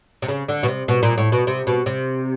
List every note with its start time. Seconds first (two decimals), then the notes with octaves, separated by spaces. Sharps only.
0.22 C3
0.28 C#3
0.48 D3
0.63 B2
0.68 C3
0.88 B2
1.03 A#2
1.18 A2
1.32 B2
1.47 C3
1.67 B2
1.86 C3